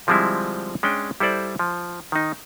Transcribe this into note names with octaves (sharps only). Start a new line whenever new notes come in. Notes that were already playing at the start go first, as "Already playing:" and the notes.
D3 F3 G3 G#3 C4 E4
G#3 C#4 D4 G5
G3 E4 A4 C5 D5
F3
D#3 D#4